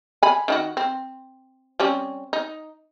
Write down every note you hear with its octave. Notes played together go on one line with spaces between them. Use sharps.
G#5 B5
D#3 E4 F#4
C4
G3 C4 C#4
D#4